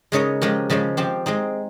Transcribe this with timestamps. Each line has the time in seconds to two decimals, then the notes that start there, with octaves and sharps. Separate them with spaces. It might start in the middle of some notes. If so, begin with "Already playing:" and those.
0.12 C#3 G#3 D#4 A#4 C#5
0.42 F3 G#3 C#4 G4 A#4
0.70 C#3 F3 G#3 C#4
0.97 F3 C4 G4
1.26 G#3 C4 D#4